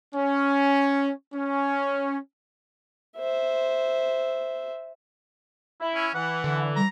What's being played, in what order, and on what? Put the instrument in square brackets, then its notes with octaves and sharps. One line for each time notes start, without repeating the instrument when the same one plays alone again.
[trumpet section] C#4
C#4
[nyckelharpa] C5 E5
[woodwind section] E4
[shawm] C#4
[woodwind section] E3 [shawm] F#5
[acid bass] D3
[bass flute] G3 [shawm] A#5